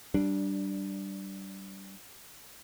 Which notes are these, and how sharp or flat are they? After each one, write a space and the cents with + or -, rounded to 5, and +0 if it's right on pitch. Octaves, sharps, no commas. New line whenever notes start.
G3 -20 D4 +0